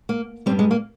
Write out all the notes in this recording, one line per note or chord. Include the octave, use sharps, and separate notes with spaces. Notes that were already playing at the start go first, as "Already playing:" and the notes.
A#3
G2 G3 C4
G#3
A#3